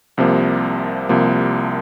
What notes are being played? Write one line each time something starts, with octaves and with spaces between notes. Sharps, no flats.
C2 C3 F3 A#3
C2 C3 F3 A#3